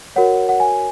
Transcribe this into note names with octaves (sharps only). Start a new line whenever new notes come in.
F#4 A#4 C#5 F#5
F#5
G#5